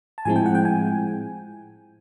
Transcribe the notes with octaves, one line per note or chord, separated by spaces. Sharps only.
A5
A2 F3 G#3 C4 E4 G#5
G5
F#5
G5
G#5